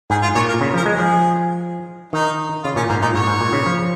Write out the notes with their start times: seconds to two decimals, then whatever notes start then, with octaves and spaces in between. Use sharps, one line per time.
0.10 G#2 G#4
0.22 F4
0.35 A#2 C#5
0.49 A#4
0.61 C#3
0.74 F3 A#4
0.86 G#3
0.95 F3 G#4
2.13 D#3 D#4
2.63 C#3 F4
2.76 A#2 C#4
2.89 G#2 A#3
3.02 A#2 D#4
3.15 G#2 C#5
3.27 G#2
3.41 A#2
3.53 C#3
3.66 F3